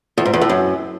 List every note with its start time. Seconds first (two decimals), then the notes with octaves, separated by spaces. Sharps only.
0.18 E2
0.26 G#2
0.34 E2
0.41 A2
0.49 F#2